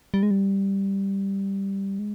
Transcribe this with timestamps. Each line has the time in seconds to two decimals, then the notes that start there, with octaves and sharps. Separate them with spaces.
0.14 G3
0.23 G#3
0.31 G3
1.99 G#3